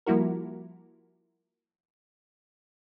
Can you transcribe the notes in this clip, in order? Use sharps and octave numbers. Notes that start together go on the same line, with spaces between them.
F3 G3 A#3 E4 F#4 A#4